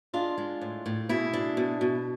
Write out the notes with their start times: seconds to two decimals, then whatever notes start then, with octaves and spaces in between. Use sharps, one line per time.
0.14 G#3 D4 F4
0.38 G#3
0.62 A2
0.86 A2
1.09 B2 E4 G#4
1.33 D4
1.57 B2
1.81 B2